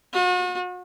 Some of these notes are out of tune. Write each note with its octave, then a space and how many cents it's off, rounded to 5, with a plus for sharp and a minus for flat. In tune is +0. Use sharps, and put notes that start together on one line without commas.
F#4 -40